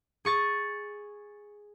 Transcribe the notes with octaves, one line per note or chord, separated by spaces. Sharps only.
G#4 C#6 A6